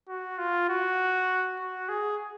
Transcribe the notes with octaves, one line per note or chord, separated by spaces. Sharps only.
F#4
F4
F#4
F#4
G#4